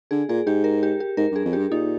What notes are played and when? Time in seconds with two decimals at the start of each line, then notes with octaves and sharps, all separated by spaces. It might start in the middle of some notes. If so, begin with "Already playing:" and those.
0.11 D3 G#4
0.29 A#2 G#4
0.47 G#2 G4
0.64 A#4
0.83 G4
1.00 G4
1.17 G#2 A#4
1.32 G2 G#4
1.45 F2
1.53 G2 G4
1.72 A#2 D#4